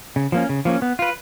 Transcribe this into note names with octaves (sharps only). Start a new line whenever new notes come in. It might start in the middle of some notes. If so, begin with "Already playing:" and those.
C#3
F3 A#3 C#4
C#3
F3 A#3 C#4
B3
F4 B4